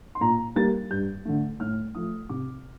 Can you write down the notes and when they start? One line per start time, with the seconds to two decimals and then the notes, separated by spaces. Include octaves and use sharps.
0.15 C6
0.21 A#2 A#5
0.56 G3 A#3 A6
0.90 G2 G6
1.25 D3 A3
1.60 A2 F6
1.95 F3 A3 D#6
2.29 C3 D6